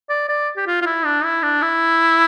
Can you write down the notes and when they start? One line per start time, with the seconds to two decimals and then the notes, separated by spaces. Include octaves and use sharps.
0.09 D5
0.29 D5
0.57 G4
0.67 F4
0.81 F4
0.86 E4
1.05 D4
1.24 E4
1.43 D4
1.62 E4